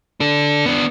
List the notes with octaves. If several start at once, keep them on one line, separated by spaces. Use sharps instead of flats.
D4 A4
B3 D4